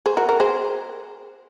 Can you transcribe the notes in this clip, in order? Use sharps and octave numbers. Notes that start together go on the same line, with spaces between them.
G#4 C5
F#4 A#4
F#4 A#4
G#4 C5